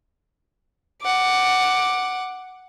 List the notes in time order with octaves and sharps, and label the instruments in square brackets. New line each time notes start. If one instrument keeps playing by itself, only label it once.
[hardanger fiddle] F#5 D6